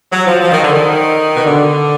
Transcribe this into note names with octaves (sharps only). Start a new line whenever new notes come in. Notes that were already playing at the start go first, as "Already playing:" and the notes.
F#3
F3
F3
D#3
D3
D#3
B2
D3